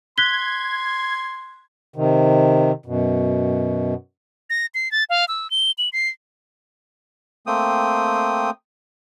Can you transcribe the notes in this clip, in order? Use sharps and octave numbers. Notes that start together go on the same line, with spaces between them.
C6 F#6 G#6 B6 G7
C3 D#3
F#2 B2
A#6
C7
A6
F5
E6
G7
F#7
C7
A3 A#3 C4 G5 D#6